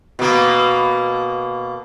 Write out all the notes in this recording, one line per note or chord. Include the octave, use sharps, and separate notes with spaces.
B2 A#3